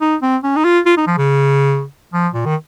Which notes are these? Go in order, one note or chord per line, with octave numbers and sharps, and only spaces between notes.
D#4
C4
C#4
D#4
F4
F4
D#4
F3
C#3
F3
A#2
D#3